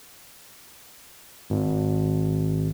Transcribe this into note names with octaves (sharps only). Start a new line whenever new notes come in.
G#1